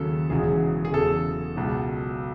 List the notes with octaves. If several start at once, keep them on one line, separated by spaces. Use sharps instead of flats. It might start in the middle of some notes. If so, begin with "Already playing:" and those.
Already playing: D#2 C#3 F#3 A4
E1 E2 C#3 F#3 G#4
G#4
E2 C#3 F#3 A4
C#2 B2 F#3